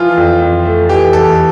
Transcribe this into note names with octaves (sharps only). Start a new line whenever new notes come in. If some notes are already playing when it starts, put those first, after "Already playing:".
Already playing: E3 F3 F4
F2
F2
A3
E3 G4
E2 A4